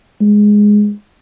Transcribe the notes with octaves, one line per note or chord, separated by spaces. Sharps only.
G#3